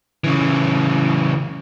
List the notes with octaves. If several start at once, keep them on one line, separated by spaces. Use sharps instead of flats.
C#3 E3